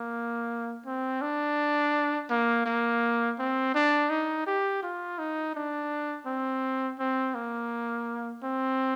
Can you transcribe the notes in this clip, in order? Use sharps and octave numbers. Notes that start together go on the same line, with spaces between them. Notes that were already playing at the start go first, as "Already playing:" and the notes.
Already playing: A#3
C4
D4
A#3
A#3
C4
D4
D#4
G4
F4
D#4
D4
C4
C4
A#3
C4